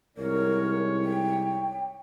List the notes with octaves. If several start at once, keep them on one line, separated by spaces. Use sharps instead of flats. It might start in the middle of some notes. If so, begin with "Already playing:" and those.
C2 G#2 A#4 C#5
G5